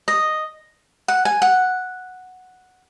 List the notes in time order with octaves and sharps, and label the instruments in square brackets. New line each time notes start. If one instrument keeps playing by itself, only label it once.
[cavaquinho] D#5
F#5
G#5
F#5